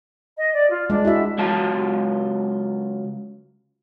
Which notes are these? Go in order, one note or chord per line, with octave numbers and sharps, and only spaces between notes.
D#5
D5
F4
G#3 D4
E4 F#4 E5
C#2 F#3 F4 A5